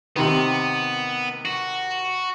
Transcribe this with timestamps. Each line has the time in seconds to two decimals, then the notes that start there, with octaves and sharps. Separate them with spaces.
0.16 C3 D#3 B3
1.45 F#4